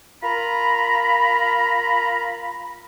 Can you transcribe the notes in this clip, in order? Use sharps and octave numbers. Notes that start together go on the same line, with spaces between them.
F4 A#4 A#5 B5